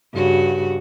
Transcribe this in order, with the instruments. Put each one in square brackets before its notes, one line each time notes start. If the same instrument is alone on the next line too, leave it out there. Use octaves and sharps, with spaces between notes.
[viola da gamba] G2 C#3 F#4